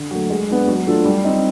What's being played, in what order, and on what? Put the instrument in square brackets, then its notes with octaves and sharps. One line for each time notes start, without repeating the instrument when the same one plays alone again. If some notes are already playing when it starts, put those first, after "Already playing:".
Already playing: [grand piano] D3
F#3 A3
G#3
B3 D4
F#3
A3 D4 F4 A4
G3
C4 D#4